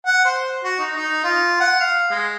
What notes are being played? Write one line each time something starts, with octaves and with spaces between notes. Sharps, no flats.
F#5
C5
F#4
D#4
D#4
F4
F#5
F5
G#3